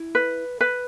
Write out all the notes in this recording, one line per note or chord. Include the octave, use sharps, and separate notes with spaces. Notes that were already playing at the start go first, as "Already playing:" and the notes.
Already playing: E4
B4
B4